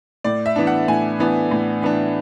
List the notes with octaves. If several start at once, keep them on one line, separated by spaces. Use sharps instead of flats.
A2 D5
E5
E3 B3 D4
F#5
A2 G#5
E3 B3 D4
A2
E3 B3 D4